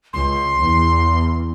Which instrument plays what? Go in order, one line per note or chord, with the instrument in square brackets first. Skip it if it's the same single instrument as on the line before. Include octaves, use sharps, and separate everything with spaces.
[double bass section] C#2 [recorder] C6
[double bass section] E2